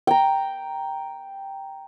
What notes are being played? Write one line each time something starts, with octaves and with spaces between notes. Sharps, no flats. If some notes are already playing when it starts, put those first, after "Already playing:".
G5 A#5